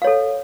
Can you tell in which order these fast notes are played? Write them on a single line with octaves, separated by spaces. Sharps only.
F5 C#5 A4